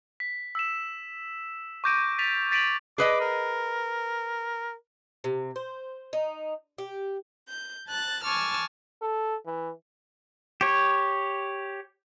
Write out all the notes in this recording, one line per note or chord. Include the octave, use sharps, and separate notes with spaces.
B6
E6 B6 E7
C#6 D6 G6 A#6 D7 D#7
A6 B6 D#7 F7
A6 B6 D7 D#7 F7 F#7
G#4 B4 D#5 D6
A#4
C3
C5
D#4
G4
G6
A5 F#6 A6
G#5 A5 C#6 D6 E6 F6
A4
E3
G4 C#5